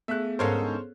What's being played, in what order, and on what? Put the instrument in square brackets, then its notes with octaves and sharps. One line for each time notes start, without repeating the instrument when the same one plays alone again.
[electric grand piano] A3 [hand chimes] B3 G#4 [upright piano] E5 F#6
[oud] D2 G#2 F5 [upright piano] C#4 A4 A#4 [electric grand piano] C5 C#5